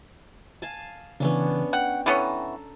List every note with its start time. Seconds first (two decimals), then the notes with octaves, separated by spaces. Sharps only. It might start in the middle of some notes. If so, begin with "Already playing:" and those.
0.62 F5 G#5 A5
1.20 C#3 E3 B3 C#4 D4
1.73 F#5 G5
2.06 E3 B3 C#4 A4 A#5